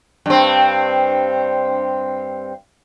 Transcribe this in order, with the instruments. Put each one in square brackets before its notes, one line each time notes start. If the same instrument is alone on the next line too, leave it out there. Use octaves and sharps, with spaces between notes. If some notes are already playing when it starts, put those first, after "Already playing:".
[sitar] G2 C4